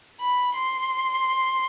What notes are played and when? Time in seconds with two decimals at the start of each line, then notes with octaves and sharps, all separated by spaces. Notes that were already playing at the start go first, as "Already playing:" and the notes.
0.20 B5
0.54 C6